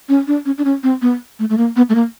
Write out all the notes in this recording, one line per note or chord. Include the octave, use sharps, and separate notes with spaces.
C#4
D4
C#4
D4
C#4
C4
B3
A3
A3
A#3
B3
A3
A#3